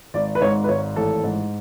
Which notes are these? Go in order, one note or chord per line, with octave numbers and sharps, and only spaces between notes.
G#1 D5
B4
G#2 C#5
B4
G#1 C#5
A1 A4
G#2